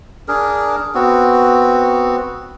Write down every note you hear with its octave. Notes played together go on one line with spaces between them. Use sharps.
D4 G#4 A#4
B3 C4 F#4